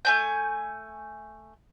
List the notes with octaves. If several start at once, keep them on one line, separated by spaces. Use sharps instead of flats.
A3 G#5 G6